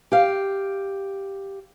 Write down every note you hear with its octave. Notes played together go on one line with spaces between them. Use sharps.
G4 F5